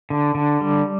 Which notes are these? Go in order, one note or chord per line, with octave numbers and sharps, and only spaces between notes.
D3
D3
G3